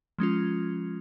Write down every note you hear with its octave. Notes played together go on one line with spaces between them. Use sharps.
F3 G#3 C#4 F4